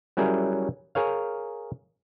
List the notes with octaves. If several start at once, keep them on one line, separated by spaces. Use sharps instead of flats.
F#3 G3 C#4 E4 G#4 A#4
G#4 A#4 C#5 F5